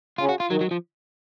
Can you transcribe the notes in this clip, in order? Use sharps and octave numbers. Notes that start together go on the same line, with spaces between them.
C#3 F4
F#4
F4
D#3 F#3
F#3
F3